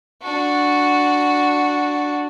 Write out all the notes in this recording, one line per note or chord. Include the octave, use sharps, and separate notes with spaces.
D4 F#4